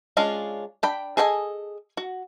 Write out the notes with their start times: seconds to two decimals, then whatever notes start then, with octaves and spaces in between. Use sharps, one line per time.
0.17 G#3 C#4 D4 F4
0.83 D4 G5 B5
1.17 G#4 A4 D#5 G5 G#5
1.97 F#4